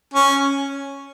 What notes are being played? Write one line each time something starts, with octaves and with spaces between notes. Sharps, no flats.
C#4